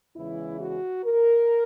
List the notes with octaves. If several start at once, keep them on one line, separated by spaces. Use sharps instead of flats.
E2 C#3 E3 G#3 E4
F#4
A#4